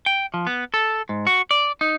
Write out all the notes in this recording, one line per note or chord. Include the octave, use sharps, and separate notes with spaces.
G5
F3
B3
A4
G#2
F#4
D5
D#4